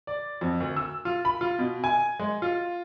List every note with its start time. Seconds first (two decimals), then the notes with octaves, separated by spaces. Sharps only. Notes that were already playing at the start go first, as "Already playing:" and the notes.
0.07 D5
0.41 F2
0.60 D2
0.77 E6
1.05 F4
1.25 B5
1.41 F4
1.59 B2
1.84 G#5
2.20 G#3
2.42 F4